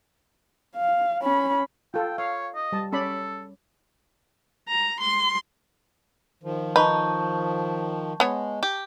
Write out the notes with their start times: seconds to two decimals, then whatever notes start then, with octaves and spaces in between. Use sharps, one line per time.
0.75 F5
1.22 C#4 B5
1.94 F4 A4 G5
2.18 C#5 F5
2.56 D#5
2.72 G3 A5
2.93 C#4 A4 D5 B5
4.68 A#5
5.01 C6
6.43 D#3 F3
6.76 D#4 B4 A5 C#6 G6
8.20 G#3 B3 C#5
8.63 G4